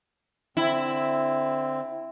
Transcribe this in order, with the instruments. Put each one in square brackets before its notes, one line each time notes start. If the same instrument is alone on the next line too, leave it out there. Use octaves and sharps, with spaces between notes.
[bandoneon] D3 C4 [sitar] E4